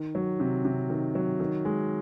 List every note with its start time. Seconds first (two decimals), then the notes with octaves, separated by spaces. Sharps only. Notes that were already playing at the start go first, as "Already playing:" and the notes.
Already playing: D#3
0.15 F#3
0.40 C3
0.65 C3
0.90 D#3
1.15 F#3
1.40 D#3
1.65 G#3